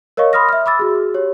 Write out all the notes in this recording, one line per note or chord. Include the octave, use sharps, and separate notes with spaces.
A#4 C#5 D#5 F5 C#6
B5 C6 D#6 F6 A#6
E5 F6
B5 D6 E6 A6
F#4 G#4
G4 C#5